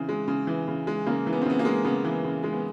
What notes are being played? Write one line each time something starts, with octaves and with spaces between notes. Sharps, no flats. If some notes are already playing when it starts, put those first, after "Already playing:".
Already playing: C#3 E3 C4
G#3
C#3
E3
C#3
G#3
C#3 A#3
E3
B3
C4
C#3 B3
A#3
G#3
C#3 B3
E3
C#3
G#3
B3